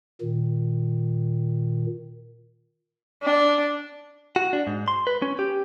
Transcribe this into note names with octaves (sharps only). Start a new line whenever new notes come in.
A#2 D#3
D4
F#4
D4
G#2
C6
B4
C#4
G4